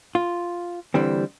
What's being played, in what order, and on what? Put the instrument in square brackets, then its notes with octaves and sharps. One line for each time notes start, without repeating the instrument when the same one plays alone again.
[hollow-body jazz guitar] F4
D3 E3 G3 C4